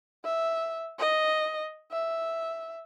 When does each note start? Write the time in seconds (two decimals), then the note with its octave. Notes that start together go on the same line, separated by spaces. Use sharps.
0.25 E5
0.99 D#5
1.92 E5